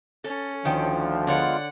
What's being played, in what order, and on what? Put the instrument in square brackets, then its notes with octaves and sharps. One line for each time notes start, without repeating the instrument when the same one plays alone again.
[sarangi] C#4 [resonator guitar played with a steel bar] A4
[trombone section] D2 F3 [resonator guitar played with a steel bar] D#3 G5
[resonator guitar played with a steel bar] D3 C#5 D5 [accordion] G#3 B3 F4 [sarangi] F#5